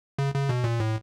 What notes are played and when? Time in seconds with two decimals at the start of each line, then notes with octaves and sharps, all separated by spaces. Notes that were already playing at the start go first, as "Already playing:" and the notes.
0.19 C#3
0.34 C#3
0.49 B2
0.64 A#2
0.80 A2